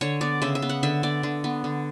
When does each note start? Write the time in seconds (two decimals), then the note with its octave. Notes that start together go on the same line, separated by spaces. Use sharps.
0.01 D3 C#5
0.21 B3 D5
0.42 C#3 E5
0.55 E5
0.62 B3
0.69 F#5
0.83 D3 E5
1.03 B3 D5
1.23 D3
1.44 B3
1.64 D3